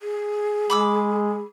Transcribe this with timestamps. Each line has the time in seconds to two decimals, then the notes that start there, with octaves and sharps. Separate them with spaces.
0.01 G#4
0.70 G#3 B5 D6 E6